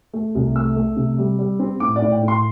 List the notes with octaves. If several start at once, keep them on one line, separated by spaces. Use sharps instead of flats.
A3
C2
A3 E6
A3
C3
G3
G3
C4
A2 D6
D5
A2
G5
A2
C6